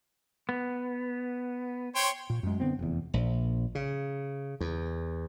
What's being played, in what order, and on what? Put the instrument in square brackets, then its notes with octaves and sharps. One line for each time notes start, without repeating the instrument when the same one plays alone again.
[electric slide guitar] B3
[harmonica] C5 C#5 G5
[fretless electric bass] A#2
F#2 G#3
D3 B3 C4
F1 E2
[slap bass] A#1
C#3
E2